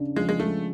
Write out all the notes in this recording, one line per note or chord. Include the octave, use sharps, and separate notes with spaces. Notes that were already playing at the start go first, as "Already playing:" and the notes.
Already playing: C#3 D4
F3 G#3
G#3
G#3 A3